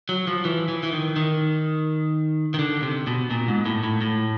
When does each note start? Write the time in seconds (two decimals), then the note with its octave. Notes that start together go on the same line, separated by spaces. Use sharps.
0.09 F#3
0.27 F3
0.45 E3
0.68 E3
0.83 E3
0.92 D#3
1.16 D#3
2.54 D#3
2.59 D3
2.82 C3
3.07 B2
3.30 A#2
3.48 G#2
3.66 A2
3.83 A2
4.01 A2